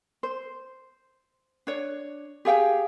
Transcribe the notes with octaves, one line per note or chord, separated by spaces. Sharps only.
C5
D4 C#5
G4 G#4 F5 G5